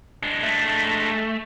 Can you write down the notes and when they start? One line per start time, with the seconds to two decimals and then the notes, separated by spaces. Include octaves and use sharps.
0.23 G#3 D4
0.43 A3